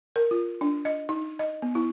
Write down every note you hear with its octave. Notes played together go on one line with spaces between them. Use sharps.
A#4
F4
D4
D#5
D#4
D#5
B3
E4